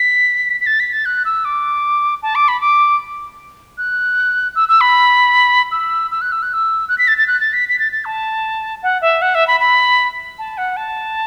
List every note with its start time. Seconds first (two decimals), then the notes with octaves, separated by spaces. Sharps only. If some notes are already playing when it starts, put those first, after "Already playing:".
Already playing: B6
0.61 B6
0.66 A6
0.80 B6
0.93 A6
1.05 F#6
1.25 E6
1.45 D6
2.23 A5
2.35 D6
2.48 B5
2.61 D6
3.78 F#6
4.56 E6
4.69 E6
4.81 B5
5.72 E6
6.11 E6
6.21 F#6
6.32 E6
6.42 F#6
6.53 E6
6.88 F#6
6.98 B6
7.08 A6
7.18 A6
7.27 F#6
7.40 A6
7.53 B6
7.69 B6
7.79 A6
7.92 A6
8.05 A5
8.83 F#5
9.02 E5
9.22 F#5
9.35 E5
9.47 B5
9.60 B5
10.39 A5
10.58 F#5
10.77 A5